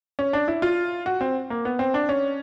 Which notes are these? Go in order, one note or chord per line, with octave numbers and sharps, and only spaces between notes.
C#4
D4
E4
F4
F#4
C4
A#3
B3
C4
D4
C#4